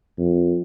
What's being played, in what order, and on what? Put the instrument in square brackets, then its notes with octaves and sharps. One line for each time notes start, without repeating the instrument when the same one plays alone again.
[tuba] F2